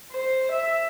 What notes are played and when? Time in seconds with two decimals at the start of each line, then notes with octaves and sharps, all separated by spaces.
0.12 C5
0.51 E5